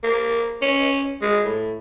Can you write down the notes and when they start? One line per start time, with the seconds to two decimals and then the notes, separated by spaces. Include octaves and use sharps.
0.03 A#3
0.62 C#4
1.22 G#3
1.45 A2